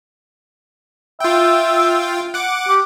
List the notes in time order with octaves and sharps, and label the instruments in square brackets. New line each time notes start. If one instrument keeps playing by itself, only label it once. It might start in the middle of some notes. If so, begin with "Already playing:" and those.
[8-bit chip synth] F4 G5 [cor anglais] E5
[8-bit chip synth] F#5 D6
[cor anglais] G4